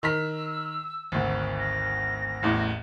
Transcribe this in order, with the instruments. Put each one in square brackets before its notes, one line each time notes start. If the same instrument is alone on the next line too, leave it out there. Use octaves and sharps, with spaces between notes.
[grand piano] D#3 A#5 B6 [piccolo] E6
[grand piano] G#1 D2
[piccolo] A#6
[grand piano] A1 E2 A2